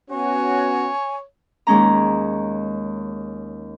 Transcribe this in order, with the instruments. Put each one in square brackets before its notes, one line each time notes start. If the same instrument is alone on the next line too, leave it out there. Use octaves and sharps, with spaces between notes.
[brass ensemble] B3 C#4 F#4 [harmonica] C#5 [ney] G#5
[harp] D#2 G#3 C#4 A#5